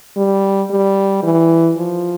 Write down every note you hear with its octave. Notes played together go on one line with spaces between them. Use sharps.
G3
G3
E3
F3